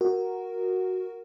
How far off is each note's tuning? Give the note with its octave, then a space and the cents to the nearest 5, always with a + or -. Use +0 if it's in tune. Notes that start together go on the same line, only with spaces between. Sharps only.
F#4 +0 A#4 +0